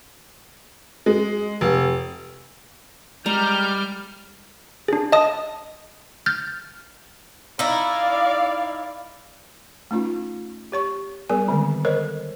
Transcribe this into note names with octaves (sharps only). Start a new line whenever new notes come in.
G#3
F1
G3 G#3 A#5 F6 G6
D4 G#4
D#5 A5 D#6
F6 G6 A6
D#4 E4 D5 F5
A3 C#4 D#4 F4
G4 C#5 C#6
G3 B3 G#4 A#4 G#5
D3 D#3 G#3 C4
A4 A#4 C5 C#5 D#5